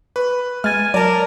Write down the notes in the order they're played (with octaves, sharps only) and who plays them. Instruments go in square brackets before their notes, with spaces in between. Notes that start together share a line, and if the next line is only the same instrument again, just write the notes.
[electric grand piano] B4 [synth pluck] C#6
[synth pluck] G#3 [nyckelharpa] G#5 [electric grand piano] F6 A6
[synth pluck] F#3 [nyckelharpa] A#4 [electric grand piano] D5 A5